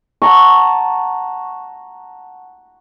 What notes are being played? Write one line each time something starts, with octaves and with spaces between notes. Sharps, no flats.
F#5 A5 A#5 C#6